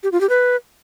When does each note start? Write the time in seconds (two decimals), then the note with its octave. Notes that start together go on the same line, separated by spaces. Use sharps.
0.03 G4
0.12 F4
0.21 G4
0.29 B4